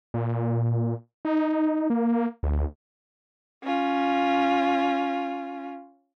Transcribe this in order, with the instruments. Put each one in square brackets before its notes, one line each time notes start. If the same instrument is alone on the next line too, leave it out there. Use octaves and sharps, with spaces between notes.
[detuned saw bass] A#2
D#4
A#3
D2
[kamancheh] C#4 F4